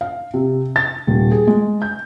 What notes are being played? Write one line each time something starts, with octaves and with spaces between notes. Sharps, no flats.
F5
C3
A6
D#1
G#4
G#3
G6